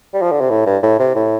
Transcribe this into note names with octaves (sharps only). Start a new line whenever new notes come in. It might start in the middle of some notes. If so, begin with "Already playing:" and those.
G3
F3
D3
C3
A2
G2
A2
C3
A2